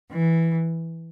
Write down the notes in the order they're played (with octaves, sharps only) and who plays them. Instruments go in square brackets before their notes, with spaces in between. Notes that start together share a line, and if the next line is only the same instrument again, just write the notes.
[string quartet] E3